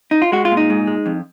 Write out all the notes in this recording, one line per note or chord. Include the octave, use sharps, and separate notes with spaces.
D#4
F4
G#3 F#4
F4
A#2
D#4
G#2
G#3
F2